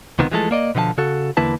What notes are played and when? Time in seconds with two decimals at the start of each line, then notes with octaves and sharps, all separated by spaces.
0.19 C#2 C3 D#3 B3
0.32 E3 F3 G#3 A3 A4
0.51 A#3 D5 D#5
0.75 B2 D3 F3 F5 A5
0.98 C#3 F#4 A4
1.37 E2 D3 A#3 E4 B4 A5